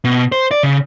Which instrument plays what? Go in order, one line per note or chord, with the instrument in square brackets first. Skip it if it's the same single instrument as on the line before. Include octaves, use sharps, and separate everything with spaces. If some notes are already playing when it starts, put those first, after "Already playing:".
[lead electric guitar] B2
C5
D5
C#3